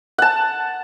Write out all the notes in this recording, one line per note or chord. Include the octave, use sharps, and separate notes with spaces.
F#5 A5